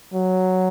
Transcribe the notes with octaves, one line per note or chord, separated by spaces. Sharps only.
F#3